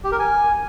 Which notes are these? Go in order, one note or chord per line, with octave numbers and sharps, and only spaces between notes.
G4
A#4
G#5